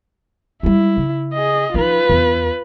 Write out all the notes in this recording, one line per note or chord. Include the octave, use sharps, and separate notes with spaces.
G3 G#3 E4
C#3
G#4 D#5
F3 D#4 F4 B4
E2